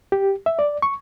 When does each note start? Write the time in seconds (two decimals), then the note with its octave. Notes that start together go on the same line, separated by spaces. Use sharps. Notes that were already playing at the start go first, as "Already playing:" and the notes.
0.12 G4
0.46 E5
0.59 D5
0.82 C#6